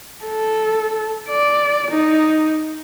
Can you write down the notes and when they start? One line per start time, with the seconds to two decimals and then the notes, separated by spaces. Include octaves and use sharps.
0.25 A4
1.29 D5
1.91 D#4